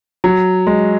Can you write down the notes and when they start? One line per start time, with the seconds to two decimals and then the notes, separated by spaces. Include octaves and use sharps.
0.24 F#3
0.67 G#3